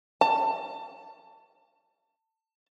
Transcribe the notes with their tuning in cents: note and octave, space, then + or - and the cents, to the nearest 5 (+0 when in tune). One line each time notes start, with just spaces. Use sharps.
A5 +20